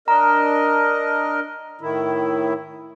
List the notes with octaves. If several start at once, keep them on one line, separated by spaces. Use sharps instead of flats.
D4 A#4 D#5 A#5
A2 D#3 E4